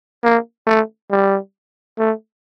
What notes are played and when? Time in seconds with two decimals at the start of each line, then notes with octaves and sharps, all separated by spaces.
0.24 A#3
0.67 A3
1.11 G3
1.99 A3